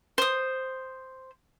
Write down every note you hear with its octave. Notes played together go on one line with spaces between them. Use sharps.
C5 D#6